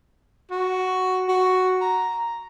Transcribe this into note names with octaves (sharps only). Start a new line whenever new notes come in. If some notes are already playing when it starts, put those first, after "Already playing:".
F#4
F#4
A#5